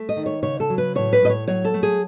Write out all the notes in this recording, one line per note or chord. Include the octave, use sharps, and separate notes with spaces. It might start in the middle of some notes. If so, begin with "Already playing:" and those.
Already playing: A3
D#5
D#3
C#5
C#3 C#5
A4
F#3
B4
A2 C#5
B4
A2 D#5
C#5
F#3 C#5
A4
A3
G#4